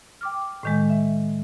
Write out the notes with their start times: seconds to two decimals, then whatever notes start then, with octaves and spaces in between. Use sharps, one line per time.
0.21 G5 D6 F6
0.63 A2 D#3 G#3
0.89 E5